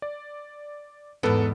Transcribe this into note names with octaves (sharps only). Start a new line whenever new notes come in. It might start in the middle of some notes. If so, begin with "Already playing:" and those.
D5
E2 G#2 B3 A4 B4